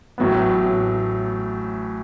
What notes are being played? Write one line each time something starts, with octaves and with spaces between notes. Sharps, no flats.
A1 A2 F#3 B3